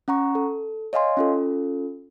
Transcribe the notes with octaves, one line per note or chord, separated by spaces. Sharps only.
C#4 F#5 A#5 C#6
A4
C#5 D#5 F5 G#5 C6
C#4 F4 A4